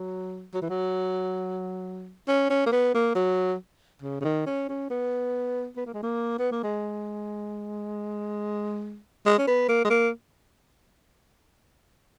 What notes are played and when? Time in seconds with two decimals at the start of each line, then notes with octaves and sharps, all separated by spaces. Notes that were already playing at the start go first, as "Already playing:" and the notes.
Already playing: F#3
0.54 F#3
0.62 E3
0.70 F#3
2.28 C#4
2.50 C#4
2.66 A#3
2.72 B3
2.94 A#3
3.15 F#3
4.02 C#3
4.21 C#3
4.24 D#3
4.46 C#4
4.69 C#4
4.90 B3
5.77 B3
5.86 A#3
5.94 G#3
6.03 A#3
6.39 B3
6.52 A#3
6.63 G#3
9.26 G#3
9.38 C#4
9.47 B3
9.69 A#3
9.85 G#3
9.90 A#3